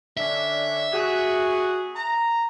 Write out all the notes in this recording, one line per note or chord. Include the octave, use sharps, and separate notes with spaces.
D3 C#4 D4 E5
F#4 G#4
A#5